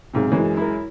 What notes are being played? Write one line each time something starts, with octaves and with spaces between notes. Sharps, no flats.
B1 G#2 C3
F#2 E3 G#3
E4 A#4